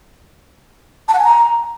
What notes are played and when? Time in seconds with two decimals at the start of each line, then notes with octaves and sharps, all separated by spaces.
1.08 A5
1.13 F#5
1.19 G#5
1.24 A#5